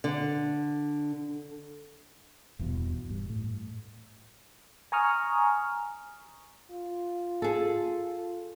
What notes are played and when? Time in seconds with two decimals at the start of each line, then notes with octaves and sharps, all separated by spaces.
0.04 D3
2.59 D#1 E2 G2 B2
3.10 G2
3.30 A2
4.92 G#5 A#5 C#6 D#6 F6
6.71 F4
7.42 G#4 A4